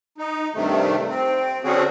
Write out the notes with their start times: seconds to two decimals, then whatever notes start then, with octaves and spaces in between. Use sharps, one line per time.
0.18 D#4
0.54 G2 C3 D#3 A3
1.09 C4
1.64 D3 F#3 C4 C#4 F#4 G#4